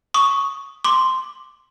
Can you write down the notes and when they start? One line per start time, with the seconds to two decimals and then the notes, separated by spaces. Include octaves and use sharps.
0.14 C#6 D#6
0.84 C6 D6